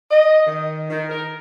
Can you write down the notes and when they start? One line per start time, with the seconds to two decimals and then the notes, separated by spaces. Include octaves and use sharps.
0.11 D#5
0.47 D#3
0.90 D#3
1.09 A#4